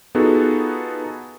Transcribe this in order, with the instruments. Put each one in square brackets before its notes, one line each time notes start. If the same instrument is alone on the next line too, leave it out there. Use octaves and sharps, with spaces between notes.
[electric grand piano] B3 D#4 F4 F#4 G#4 A4